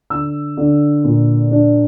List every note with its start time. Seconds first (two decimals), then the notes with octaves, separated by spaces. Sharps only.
0.10 D3 E6
0.57 D3
1.04 A#2
1.51 D4